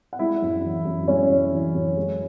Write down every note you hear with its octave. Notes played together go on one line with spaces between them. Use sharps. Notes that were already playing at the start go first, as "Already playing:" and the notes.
F#5
G#3 E4 E5
F#2
E3
F#2
G#3 C#4 C#5
F#2
E3
F#2
G#3